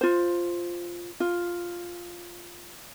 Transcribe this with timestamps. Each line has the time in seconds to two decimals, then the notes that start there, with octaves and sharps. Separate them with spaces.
0.01 F4 C5
1.20 F4